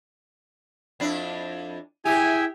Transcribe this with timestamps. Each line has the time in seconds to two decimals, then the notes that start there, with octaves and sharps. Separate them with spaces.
1.00 F2 D4 E4
2.05 E4 G4 G#4 E5 G5 G#5